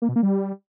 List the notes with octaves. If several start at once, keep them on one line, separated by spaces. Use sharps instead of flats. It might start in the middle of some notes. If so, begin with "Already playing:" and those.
A#3
B2
A#3
G3